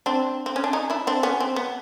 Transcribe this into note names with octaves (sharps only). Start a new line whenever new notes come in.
C4 D4
C4
C#4
D4
C#4 D#4
D4 E4
C4 D4
B3 C#4
C4
B3